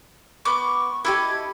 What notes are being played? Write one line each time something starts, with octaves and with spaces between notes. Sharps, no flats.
B3 C#6 D6
E4 G4 A4 D#5 D6 G#6